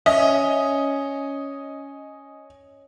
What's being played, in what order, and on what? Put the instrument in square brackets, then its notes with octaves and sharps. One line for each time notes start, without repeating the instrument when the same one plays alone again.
[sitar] C#4 [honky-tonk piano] D#5 [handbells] E5